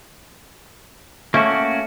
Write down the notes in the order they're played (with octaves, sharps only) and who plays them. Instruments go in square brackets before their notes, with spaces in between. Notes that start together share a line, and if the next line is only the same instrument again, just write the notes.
[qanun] A3 [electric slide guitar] A#3 C#4 F#4